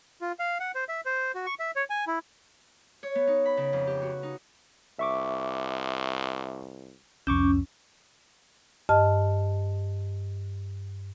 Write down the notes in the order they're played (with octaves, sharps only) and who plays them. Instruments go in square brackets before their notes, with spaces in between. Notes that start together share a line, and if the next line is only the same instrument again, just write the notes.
[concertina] F4
F5
F#5
C5
E5
C5
F#4
C#6
E5
C#5
G#5
E4
[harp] C#5
B3
D#4
B5
C#3
F2
G4
F#4
D#4
[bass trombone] C2 [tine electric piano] E5 C#6 D6
[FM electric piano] C2 F2 [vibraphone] C#4 [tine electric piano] C#6 D6 G6
[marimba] G2 D#5 A5 F6